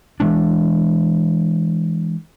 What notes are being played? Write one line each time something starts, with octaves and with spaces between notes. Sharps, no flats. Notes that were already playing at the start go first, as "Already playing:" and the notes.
E3 G#3 D4